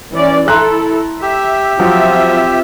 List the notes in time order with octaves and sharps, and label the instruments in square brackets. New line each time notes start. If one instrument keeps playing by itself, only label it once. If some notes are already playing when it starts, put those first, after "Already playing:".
[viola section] E3 C#4 D5
[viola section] E4 A4 [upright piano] A#5 C6 F#6
[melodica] G4 [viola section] E5
[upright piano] F3 F#3 [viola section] C4 F4 E5